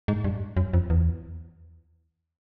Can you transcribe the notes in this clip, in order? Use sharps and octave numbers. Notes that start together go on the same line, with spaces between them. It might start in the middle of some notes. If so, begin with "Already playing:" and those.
G#2
G2
F#2
F2
E2